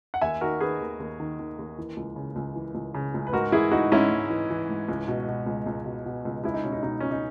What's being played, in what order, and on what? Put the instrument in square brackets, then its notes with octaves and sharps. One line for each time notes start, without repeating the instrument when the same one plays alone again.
[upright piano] F#5
D#2 E5 G#5
D#3 F#4 A#4
D#3 G#4 B4
D#2
D#2
D#3
D#3
D#2
E3
C#2
C#3
C#2
E3
C#2
C#3
C#2
B4
G#2 F#4 A#4
E3 E4 G#4
E3 D#4 F#4
G#2 C#4 E4
G#2
E3
E3
G#2
C#2
B2
B2
C#2
C#2
B2
B2
C#2
C#2 E4
D#4
B2 C#4
D#4
B2 D#4
C#2 C#4
D#4